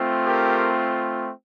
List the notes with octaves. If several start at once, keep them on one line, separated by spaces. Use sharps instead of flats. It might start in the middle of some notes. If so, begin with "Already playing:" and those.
Already playing: A3 C4 F4
G4 A#4